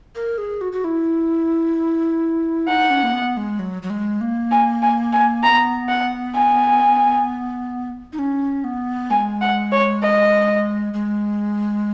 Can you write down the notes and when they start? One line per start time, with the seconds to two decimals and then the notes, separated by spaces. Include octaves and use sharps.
0.15 A#4
0.38 G#4
0.61 F#4
0.73 F#4
0.84 E4
2.68 D#4 F#5
2.90 C#4
3.03 A#3
3.13 B3
3.37 G#3
3.59 F#3
3.82 F#3
3.90 G#3
4.21 A#3
4.51 G#5
4.82 G#5
5.13 G#5
5.43 B3 A#5
5.89 F#5
6.35 G#5
8.13 D#4
8.19 C#4
8.64 B3
9.11 G#3 G#5
9.41 F#5
9.72 C#5
10.02 D#5
10.94 G#3